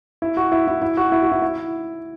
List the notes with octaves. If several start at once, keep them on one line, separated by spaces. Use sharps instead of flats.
E4
F#4
E4
E4
E4
F#4
E4
F#4
E4
E4